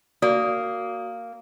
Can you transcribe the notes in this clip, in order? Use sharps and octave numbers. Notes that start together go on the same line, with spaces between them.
A#3 F#4 D5 D#6